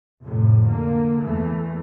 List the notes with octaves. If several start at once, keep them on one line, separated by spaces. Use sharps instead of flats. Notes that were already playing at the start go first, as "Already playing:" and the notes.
F2 A2 C3
D3 A#3
E2 E3 A3